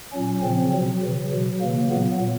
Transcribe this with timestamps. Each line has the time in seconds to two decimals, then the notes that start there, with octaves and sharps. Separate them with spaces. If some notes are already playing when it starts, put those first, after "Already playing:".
0.13 A#2 F#3 C#4
0.42 C#3 F3 C4
0.72 B2 F#3
1.01 C#3 E3
1.32 B2 F#3
1.60 C#3 E3 A#3
1.90 A#2 F#3 B3